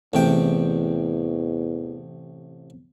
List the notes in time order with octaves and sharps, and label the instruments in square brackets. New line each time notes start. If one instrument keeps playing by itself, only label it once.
[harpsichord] A1 C3 G5 [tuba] E2